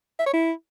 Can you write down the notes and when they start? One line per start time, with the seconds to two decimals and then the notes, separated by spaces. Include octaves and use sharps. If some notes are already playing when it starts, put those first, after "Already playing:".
0.19 E5
0.26 C#5
0.33 E4